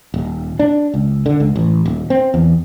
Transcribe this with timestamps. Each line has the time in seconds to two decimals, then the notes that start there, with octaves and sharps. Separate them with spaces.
0.14 D#1
0.59 D4
0.94 C#2
1.26 D3
1.40 C#2
1.56 A1
1.86 D#1
2.10 C4
2.34 E2